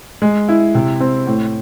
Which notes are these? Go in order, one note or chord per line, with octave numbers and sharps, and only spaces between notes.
G#3
E4
C3
C4
A2